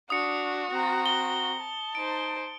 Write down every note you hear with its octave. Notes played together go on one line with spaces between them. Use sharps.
D4 F#4 D#6 C#7
C4 A#5
G7
A5
D#4 C5 D7